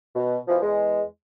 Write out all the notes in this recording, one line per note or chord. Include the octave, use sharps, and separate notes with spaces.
B2
B2 E3 F3
E2 G#3